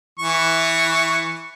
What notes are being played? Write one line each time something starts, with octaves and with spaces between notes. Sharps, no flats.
E3 C#6